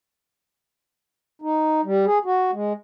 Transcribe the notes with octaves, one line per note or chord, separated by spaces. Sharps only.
D#4
G3
G#4
F#4
G#3